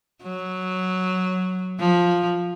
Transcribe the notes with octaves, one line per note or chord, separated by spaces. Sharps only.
F#3
F3